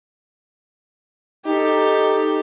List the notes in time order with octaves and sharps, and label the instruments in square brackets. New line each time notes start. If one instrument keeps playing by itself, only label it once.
[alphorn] D#4 [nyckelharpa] G4 A4